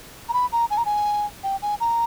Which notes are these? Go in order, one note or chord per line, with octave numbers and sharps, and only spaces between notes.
A#5
B5
A#5
G#5
A#5
G#5
G5
G#5
A#5